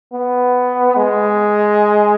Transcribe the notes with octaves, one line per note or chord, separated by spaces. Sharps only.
B3
G#3